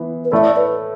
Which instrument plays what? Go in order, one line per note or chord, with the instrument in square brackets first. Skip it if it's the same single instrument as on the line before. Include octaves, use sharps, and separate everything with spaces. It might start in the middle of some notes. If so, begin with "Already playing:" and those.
Already playing: [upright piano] E3 B3
[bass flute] B4
[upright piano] A2 A3 E4 A4 [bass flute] D5
[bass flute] B4